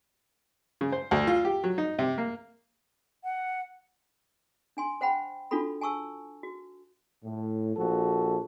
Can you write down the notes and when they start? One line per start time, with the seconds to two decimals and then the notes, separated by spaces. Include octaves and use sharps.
0.81 C#3
0.92 C5
1.11 D2
1.27 F4
1.45 G4
1.64 F#3
1.78 D#4
1.99 C3
2.18 A#3
3.24 F#5
4.77 D4 G#5 C6
5.01 C5 F#5 G5 B5
5.51 D4 F4 F#4 A4 B5
5.81 G#5 A5 C#6 E6
6.43 F#4
7.24 A2
7.76 A#1 F3 F#4 A4